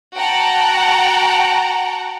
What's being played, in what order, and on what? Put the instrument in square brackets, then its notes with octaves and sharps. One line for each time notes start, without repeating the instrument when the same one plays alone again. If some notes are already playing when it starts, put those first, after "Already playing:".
[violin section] F#4 F#5 G5 A5 A#5